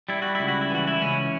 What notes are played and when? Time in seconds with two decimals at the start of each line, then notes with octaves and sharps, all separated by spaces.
0.09 G3 E4
0.22 F#4
0.35 E4
0.40 C#2
0.48 F#4
0.61 E4
0.70 E3 F#4
0.87 E4
1.01 C#2 C#4